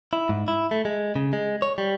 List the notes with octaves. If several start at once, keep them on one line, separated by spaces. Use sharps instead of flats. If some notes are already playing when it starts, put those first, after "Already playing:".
E4
G#2
E4
A3
G#3
C#3
G#3
C#5
G3